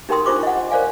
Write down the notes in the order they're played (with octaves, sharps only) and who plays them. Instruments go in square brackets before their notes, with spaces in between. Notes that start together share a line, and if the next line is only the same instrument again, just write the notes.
[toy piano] D#4 G4 A#4 G5 C6 D#6
D4 D#4 F4 C5 C#6 D6
D#5 F#5
A#4 C5 D5 F5 G#5